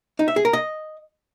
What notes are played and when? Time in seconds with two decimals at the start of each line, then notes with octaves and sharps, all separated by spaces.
0.19 D#4
0.28 E5
0.36 G#4
0.45 A#4
0.53 D#5